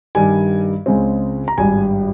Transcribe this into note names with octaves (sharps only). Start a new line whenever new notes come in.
G2 D#3 G3 G#5
C#2 C#3 G#3 C4
A#5
G#1 G2 G3 G#5